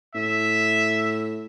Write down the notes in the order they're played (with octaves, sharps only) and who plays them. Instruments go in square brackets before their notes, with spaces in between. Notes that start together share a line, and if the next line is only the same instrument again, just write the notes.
[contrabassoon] A2 [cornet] E5